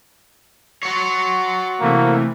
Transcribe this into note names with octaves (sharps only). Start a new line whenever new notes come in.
F#4 C#5 C6 C#6 A6
C3 E3 A3 A#3